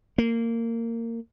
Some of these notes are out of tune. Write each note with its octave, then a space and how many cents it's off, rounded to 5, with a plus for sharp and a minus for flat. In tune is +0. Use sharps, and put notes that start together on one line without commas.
A#3 -20